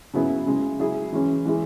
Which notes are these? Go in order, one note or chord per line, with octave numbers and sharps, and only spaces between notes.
C#3 F#3 B3 E4 G#4
C#3 G#3 E4 G#4
F#3 E4 G#4
E3 G#3 C#4
E3 G#3 E4 G#4